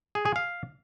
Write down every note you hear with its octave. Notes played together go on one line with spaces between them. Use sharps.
G#4
G#4
F5